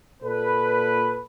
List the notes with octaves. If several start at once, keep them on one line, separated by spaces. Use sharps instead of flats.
A#2 A4 B4